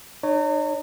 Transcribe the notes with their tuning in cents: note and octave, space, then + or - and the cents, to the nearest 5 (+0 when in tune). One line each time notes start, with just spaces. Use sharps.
D#4 -40 C#5 +0